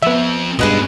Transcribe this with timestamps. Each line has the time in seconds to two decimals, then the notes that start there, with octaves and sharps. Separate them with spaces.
0.02 F3 B3 C4 E5
0.59 G2 B2 G#3 C#4 G#4 B4 D#5